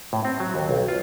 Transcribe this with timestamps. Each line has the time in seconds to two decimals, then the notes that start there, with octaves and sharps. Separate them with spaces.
0.13 A2
0.25 C4
0.40 F#3
0.55 D#2
0.69 B1
0.88 F4